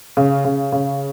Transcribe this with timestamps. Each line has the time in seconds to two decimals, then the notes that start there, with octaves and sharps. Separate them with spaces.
0.17 C#3
0.44 C#3
0.72 C#3